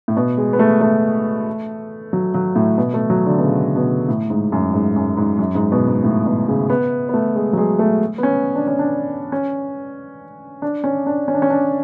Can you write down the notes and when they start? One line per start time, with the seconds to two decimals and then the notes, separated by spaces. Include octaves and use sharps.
0.08 A2
0.17 B2
0.37 G#3
0.53 B3
0.59 A3
0.81 A3
2.13 F#3
2.34 F#3
2.56 A2
2.78 B2
2.94 A3
3.10 F#3
3.26 D3
3.38 B2
3.42 C#3
3.76 B2
4.09 A2
4.30 G#2
4.52 F#2
4.73 G#2
4.96 F#2
5.17 G#2
5.39 F#2
5.55 G#2
5.72 B2
5.88 G#2
6.04 A2
6.26 B2
6.48 C#3
6.70 B3
7.09 B3
7.14 A3
7.35 G#3
7.53 F#3
7.57 G#3
7.79 A3
8.18 B3
8.23 C#4
8.56 D4
8.68 C#4
8.79 D4
9.32 C#4
10.62 D4
10.84 C#4
11.07 D4
11.28 C#4
11.34 D4
11.42 C#4
11.50 D4